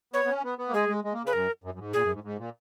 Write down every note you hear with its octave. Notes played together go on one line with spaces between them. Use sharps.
B3 C#5
B3
C#4
B3
B3
A#3
G#3 G#4
G#3
G#3
A#3
C#3 B4
F#2 A#4
F#2
F#2
G#2
A#2 G#4
F#2
G#2
G#2
A#2